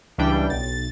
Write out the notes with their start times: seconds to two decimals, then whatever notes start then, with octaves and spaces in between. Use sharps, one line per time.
0.18 C#2 E3 G3 D4 G5
0.50 B1 A6